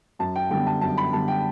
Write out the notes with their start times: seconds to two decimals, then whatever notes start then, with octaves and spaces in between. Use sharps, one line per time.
0.19 F#2 A5
0.36 G5
0.50 D3 G3 B3 G5
0.67 A5
0.81 F#2 A5
0.98 B5
1.13 D3 G3 B3 A5
1.28 G5